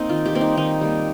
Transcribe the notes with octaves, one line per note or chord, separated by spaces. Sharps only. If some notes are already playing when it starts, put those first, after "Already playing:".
Already playing: A#3 C4 D#4
D#3 F4
G4
G3 A#3 C4
D#4
D#3 D#4
G3 A#3